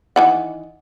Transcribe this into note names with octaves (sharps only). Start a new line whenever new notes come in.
D#3 E3 F#5